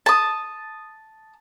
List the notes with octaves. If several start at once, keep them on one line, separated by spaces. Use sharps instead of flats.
A5 D#6